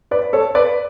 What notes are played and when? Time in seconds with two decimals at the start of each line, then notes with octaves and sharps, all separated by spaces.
0.11 B4 D5
0.33 A4 C#5
0.55 B4 D5